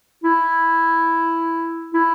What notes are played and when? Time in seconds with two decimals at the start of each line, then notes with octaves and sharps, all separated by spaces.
0.24 E4
1.94 E4